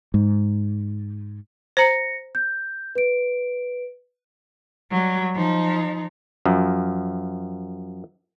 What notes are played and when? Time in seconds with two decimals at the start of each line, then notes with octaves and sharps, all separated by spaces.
0.14 G#2
1.77 C5 A#5 A#6 C#7
2.35 G6
2.95 B4 D7
4.91 F#3 G3
5.35 F3 D#4
6.46 F#2 F3